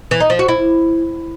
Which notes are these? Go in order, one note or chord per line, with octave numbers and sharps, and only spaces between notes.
E3
D#4
F3
F#4
E4